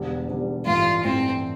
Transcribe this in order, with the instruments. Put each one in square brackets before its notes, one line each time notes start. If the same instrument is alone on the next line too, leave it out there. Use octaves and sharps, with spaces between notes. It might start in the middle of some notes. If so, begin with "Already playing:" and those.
Already playing: [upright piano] E1 E2 D3 G3
E1 E2 D3 G3
[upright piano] A1 G2 E3 A3 E4 [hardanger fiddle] F4
[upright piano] A1 G2 E3 A3 E4 [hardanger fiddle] C4